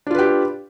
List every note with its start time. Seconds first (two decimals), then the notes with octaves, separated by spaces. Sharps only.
0.07 D4
0.11 F4
0.15 B4
0.19 G4